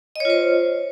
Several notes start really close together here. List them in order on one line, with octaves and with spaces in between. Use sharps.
D#5 C#5 F4 C5